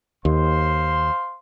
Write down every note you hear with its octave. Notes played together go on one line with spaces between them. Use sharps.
D#2 C5 F5 C6